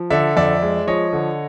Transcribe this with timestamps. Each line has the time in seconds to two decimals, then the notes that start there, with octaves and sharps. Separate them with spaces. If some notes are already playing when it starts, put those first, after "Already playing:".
Already playing: F3
0.10 D3 D5 E5
0.36 F2 D5 E5
0.62 G#3
0.87 F3 C#5 D#5
1.13 D3